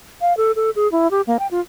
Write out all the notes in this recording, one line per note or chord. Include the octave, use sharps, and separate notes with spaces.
F5
A4
A4
G#4
E4
G4
A#3
G5
F4